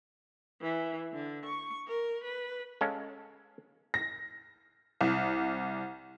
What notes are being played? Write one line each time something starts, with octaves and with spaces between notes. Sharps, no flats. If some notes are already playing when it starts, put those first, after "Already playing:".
E3
D3
C#6
A#4
B4
G#3 C#4 A4 F5
A#6
C2